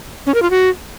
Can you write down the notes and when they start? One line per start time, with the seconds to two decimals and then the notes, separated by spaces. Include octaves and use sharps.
0.26 C#4
0.34 A#4
0.42 F4
0.50 F#4